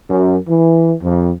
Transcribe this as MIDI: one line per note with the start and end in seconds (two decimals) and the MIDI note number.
0.10 0.37 42
0.48 0.94 52
1.03 1.31 41